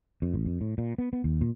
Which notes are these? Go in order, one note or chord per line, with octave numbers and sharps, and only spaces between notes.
F2
A1
F2
A2
A#2
B3
B3
D#2
A#2